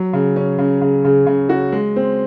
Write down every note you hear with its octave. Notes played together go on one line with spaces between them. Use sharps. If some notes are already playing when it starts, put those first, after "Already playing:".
Already playing: F#3
C#3
C#4
C#3
C#3
C#3
C#3
F#4
G#3
C4